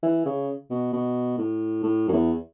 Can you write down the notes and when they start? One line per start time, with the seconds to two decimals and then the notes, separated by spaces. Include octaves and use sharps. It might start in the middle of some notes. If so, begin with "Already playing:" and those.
0.03 E3
0.25 C#3
0.70 B2
0.93 B2
1.38 A2
1.83 A2
2.08 F#2
2.13 E2